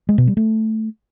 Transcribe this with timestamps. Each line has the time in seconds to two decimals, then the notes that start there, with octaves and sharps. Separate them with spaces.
0.09 G#3
0.18 B2
0.27 G3
0.37 A3